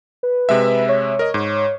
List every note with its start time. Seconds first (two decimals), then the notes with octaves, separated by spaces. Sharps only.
0.23 B4
0.49 C3 G#3 E5
0.89 C#5
1.19 A#4 D#5
1.34 G#2